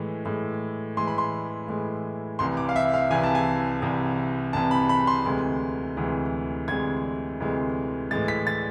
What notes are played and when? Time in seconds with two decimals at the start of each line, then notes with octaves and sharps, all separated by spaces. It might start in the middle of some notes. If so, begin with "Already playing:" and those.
Already playing: A2 E3 G#3
0.25 A2 E3 G#3
0.97 A2 E3 G#3 C6
1.07 B5
1.18 C6
1.68 A2 E3 G#3
2.39 C2 C3 E3 C6
2.57 D6
2.69 F5
2.76 E5
2.94 F5
3.11 C2 C3 E3 G#5
3.24 A5
3.35 G#5
3.82 C2 C3 E3
4.53 C2 C3 E3 A5
4.71 B5
4.89 B5
5.07 C6
5.26 D2 C3 E3 G#3
5.97 D2 C3 E3 G#3
6.68 D2 C3 E3 G#3 G#6
7.40 D2 C3 E3 G#3
8.11 A2 E3 G#3 A6
8.28 B6
8.47 A6